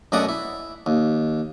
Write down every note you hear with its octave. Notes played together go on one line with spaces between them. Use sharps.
F#2 B2 A3 D5 F#5 D#6
E4
D#2